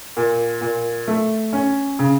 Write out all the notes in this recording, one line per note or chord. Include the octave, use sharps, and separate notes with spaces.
A#2
A#2
A3
C#4
C#3